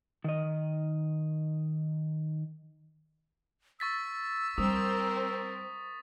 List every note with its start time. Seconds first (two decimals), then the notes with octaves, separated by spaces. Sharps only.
0.24 D#3 D#5
3.80 C#6 E6 A6 B6
4.58 G3 C4 A#4 D#6